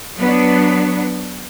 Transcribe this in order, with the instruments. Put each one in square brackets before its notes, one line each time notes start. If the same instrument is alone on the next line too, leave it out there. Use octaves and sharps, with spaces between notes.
[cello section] F#3 B3 D4